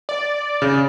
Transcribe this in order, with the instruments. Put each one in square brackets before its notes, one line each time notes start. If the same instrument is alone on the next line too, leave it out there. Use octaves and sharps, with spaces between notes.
[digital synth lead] D5
[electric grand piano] C#3